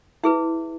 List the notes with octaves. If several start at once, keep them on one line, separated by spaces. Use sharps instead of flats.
E4 G#4 B4 E5